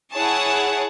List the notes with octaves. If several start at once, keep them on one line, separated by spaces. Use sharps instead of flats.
E4 G#4 C#5 F#5 A5